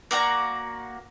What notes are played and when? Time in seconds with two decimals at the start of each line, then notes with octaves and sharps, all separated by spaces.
0.11 A#3 F#4 D5 A#5